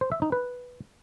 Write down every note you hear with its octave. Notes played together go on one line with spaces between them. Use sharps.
C5
E5
D#4
B4